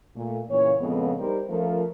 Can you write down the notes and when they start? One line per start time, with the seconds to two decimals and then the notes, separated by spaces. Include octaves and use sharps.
0.15 A#2 A3
0.49 A#2 C#3 E3 C#5
0.80 F2 A#2 C#3 G#3 B3
1.18 G3 D#4 A#4 C5
1.49 F3 A3 C#4 F4 A#4